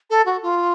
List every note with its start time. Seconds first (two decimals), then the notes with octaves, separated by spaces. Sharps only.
0.10 A4
0.26 F#4
0.42 F4